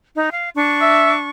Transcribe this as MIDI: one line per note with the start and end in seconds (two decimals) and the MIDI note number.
0.16 0.30 63
0.32 0.48 77
0.55 1.30 62
0.55 1.30 85
0.82 1.12 76